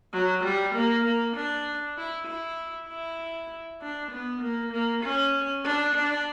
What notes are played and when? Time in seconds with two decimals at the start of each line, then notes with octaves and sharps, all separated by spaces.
0.13 F#3
0.44 G3
0.75 A#3
1.05 A#3
1.36 D4
1.98 E4
2.27 E4
2.89 E4
3.82 D4
4.11 B3
4.42 A#3
4.72 A#3
5.04 C#4
5.64 D4
5.95 D4